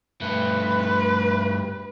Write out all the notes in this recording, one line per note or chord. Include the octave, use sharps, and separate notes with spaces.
G2 A3 B4